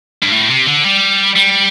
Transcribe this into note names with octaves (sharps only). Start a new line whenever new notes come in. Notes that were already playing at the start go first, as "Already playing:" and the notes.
G2
A2
C3
D3
G3
G3